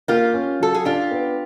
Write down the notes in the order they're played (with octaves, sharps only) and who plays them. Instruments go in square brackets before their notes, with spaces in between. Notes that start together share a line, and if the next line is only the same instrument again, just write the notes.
[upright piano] A#3 [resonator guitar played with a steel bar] F4 G4
[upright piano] C#4
[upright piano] F#3 [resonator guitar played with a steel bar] A4
[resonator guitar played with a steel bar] G#4
[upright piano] D4 [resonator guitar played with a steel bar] F4 G4
[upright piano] B3